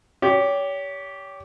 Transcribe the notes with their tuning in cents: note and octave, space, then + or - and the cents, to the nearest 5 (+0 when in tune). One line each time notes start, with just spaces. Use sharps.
G4 +0 C#5 +35